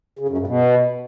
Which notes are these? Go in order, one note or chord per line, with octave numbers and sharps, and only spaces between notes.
C#3
F#2
G2
B2